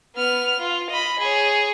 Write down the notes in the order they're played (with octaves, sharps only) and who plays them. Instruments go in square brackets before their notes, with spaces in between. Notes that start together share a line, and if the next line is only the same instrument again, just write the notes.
[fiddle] B3 F6
F4
D#5 B5
G#4 C#5